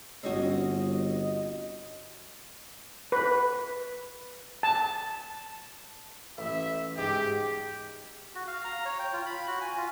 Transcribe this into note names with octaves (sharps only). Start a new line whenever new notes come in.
G1 C4 C#4 F#4 D#5
B4
A5
A1 E5
G#2 G4
F#4
F5
A#5
C#5
G5
F4
B5
F#4
G#5
F4